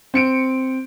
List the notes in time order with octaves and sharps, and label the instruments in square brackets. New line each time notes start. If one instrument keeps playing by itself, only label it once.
[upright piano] C4 C#7 D7